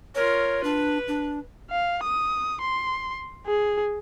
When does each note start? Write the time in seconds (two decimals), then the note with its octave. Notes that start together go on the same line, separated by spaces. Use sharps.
0.15 F4 A#4 C#5
0.64 D4 B4
1.08 D4
1.70 F5
2.04 D#6
2.61 C6
3.47 G#4